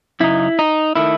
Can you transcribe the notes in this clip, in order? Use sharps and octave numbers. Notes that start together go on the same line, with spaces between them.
F#2 C#3 D#4 E4
D#4
D#3 A3 E4